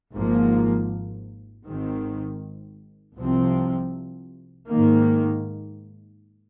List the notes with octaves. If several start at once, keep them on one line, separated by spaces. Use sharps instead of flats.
G#1 G#2 F3 A#3
G#1 G#2 D#3 C4
C2 C3 F3 C4
G#2 D#3 A#3